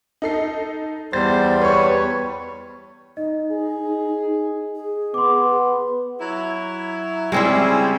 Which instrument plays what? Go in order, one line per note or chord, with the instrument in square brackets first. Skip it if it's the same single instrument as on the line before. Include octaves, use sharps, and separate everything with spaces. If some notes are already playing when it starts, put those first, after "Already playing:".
[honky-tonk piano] D#4 A4 C7
[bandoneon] E2 G3 [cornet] C5 [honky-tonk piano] A6
[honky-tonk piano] B4 C#6 [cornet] C#5
[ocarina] D#4 [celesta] D#5
[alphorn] G#4
[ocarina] G#4
[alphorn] B3 [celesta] C6 D6
[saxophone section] F#3 E4
[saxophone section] C#3 G3 [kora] G#3 C4 E4